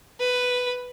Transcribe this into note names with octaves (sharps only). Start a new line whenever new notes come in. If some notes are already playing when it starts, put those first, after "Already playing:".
B4